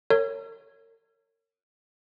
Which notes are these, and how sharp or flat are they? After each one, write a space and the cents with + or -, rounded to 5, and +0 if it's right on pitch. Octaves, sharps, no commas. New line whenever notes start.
A#4 -40 C#5 +0